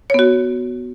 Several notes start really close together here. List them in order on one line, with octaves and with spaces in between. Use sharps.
C#5 B3 F#4